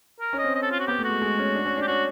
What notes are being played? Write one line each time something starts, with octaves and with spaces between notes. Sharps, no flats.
A#4
C#4
D#5
C4
D#5
A4
F4
F#4
B3 G4
A3
F#4
G#3
G#3
C#4
D4
C#4
D4 G4
C#4 F#4